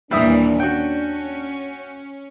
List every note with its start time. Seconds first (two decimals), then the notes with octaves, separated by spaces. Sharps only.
0.11 D#2 A#2 E3 G3 D4 E5 D#6
0.60 C#4 F#4 G5